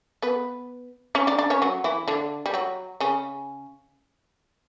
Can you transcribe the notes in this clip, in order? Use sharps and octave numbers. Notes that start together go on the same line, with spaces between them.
B3 B4
C#4 C#5
D4 D5
D4 D5
C#4 C#5
F#3 F#4
E3 E4
D3 D4
G3
F#3
C#3 C#4